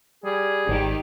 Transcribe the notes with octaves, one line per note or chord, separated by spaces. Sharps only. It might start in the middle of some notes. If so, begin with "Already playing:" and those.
G3 G#4
G#1 D#3 G4